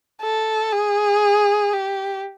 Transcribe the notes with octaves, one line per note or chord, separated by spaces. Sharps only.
A4
G#4
G4